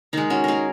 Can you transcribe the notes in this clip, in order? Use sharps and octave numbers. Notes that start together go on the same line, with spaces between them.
D#3 G#3 D#4
C#4 F#4
D#4 G#4 A#4